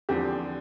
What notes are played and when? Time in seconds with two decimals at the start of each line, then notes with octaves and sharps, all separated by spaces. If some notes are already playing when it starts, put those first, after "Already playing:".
0.09 E2 D3 F3 C4 G4